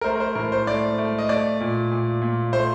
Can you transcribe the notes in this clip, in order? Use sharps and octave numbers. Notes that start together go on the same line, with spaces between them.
A#4
A3 C5
A#4
C5
A2 A#4
C5
A3 D5
A3
D#5
A3 D5
A#2
A#2
A#2
A3 C5